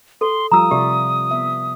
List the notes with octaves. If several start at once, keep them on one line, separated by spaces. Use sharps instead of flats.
A4 C6
F3 G3 F4 A#5 D#6 E6
C3 G4 D5 E5
B3 E5